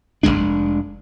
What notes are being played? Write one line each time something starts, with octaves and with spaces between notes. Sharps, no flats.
F1 F2 G#3 D4